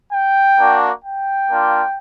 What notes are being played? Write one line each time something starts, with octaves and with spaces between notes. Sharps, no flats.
G5
A#3 D4 F#4
G5
A#3 D4 F4